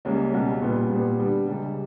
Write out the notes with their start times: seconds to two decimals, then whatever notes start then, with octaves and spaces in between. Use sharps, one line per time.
0.05 C#2 C#3 G3 A#3 C#4
0.33 C#2 B2 G3
0.62 A#2 G3 B3
0.90 A#2 G3 B3
1.19 D3 G3 B3
1.47 C#2 C#3 G3